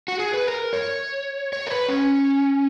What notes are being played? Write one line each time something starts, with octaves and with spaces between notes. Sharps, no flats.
F#4
G#4
B4
A#4
C#5
C#5
A#4
B4
C#4